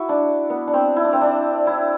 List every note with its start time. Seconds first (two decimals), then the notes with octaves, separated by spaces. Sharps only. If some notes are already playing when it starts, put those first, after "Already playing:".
Already playing: E4 F#4
0.09 D4
0.50 B3
0.68 D4
0.74 C4
0.96 E4
1.05 D4
1.13 C4
1.21 D4
1.67 E4